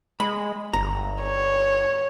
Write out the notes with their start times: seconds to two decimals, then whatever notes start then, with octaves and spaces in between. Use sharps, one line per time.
0.20 G#3 B5
0.73 G1 A#5
1.23 C#5